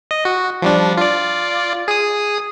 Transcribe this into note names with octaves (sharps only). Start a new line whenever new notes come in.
D#5
F#4
F3 G3 D4
F4 D5
G#4 D#6